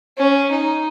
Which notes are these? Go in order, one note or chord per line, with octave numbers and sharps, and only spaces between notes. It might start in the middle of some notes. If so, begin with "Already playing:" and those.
C#4
D#4